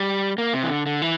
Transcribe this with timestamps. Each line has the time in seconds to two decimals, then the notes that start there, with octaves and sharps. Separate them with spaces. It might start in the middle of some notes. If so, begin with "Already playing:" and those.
Already playing: G3
0.38 A#3
0.54 C3
0.63 E3
0.70 D3
0.86 D3
1.02 E3